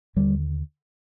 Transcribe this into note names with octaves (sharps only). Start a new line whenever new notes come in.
D#2 D3 G3